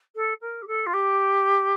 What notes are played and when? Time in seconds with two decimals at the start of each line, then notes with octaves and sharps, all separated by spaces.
0.15 A4
0.41 A#4
0.62 G4
0.67 A4
0.86 F4
0.93 G4